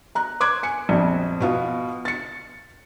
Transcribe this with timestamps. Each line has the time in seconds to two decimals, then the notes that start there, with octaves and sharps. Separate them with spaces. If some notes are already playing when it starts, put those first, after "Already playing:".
0.15 A#5 F#6
0.40 C6 D6 F#6 G#6 D7
0.63 G#5 C#7
0.89 A#1 F2
1.40 B2 B3 F4
2.05 A6 C#7